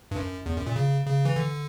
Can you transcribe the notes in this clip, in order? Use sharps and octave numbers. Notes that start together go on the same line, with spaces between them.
G2
F#2
E2
F#2
A#2
C#3
C#3
E3
D3